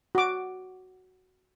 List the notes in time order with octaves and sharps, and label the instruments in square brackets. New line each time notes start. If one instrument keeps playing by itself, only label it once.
[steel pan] F#4 D6